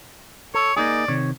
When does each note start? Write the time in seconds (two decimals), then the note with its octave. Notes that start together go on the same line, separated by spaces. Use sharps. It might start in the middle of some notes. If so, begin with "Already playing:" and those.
0.54 A4 C#5
0.77 A#3 D#4 G#4 D5
1.08 C3 D#3 C#5